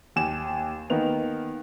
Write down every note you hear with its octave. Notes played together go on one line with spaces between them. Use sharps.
D#2 G#5 E7
D#3 A#3 B3 F7